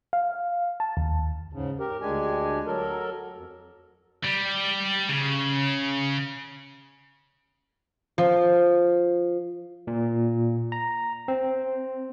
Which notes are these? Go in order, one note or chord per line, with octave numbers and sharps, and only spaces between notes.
F5
A5
D#2
G#2 C#3
G4 A#4
D2 G#3 D4 G4 G#5
F#3 A4 A#4
F2
G3
C#3
F3
A#2
A#5
C4